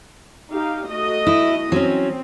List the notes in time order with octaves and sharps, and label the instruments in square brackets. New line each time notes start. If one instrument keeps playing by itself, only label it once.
[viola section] D#4 G4 F5
A3 F#4 D#5
[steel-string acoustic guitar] E4
[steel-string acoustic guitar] F#3 C#4 [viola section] C4